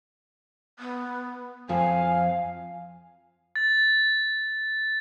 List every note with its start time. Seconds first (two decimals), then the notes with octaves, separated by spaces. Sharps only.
0.79 B3
1.69 F2 F3 F5 G#5
3.56 A6